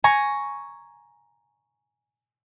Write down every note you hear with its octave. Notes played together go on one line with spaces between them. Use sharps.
G#5 A#5 C#6